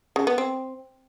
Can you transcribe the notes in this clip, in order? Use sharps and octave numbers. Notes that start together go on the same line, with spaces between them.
C#3
B3
C4